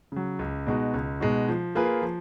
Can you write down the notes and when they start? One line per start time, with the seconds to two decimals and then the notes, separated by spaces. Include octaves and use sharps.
0.12 C#3 F#3
0.39 C#2
0.67 B2 G#3 D#4 F#4
0.94 C#2
1.20 B2 G#3 D#4 F#4
1.48 F3
1.75 A#3 F4 G#4 B4
2.02 F3